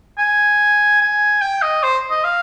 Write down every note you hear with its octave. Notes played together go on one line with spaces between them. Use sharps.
G#5
G#5
G5
D#5
C5
D#5
F5